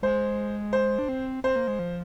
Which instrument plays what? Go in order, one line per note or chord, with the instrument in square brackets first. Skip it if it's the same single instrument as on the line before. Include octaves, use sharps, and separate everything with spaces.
[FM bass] G#3 [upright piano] C5
[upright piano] C5
[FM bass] D4
C4
[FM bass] C4 [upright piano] C5
[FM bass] A#3
G#3
F3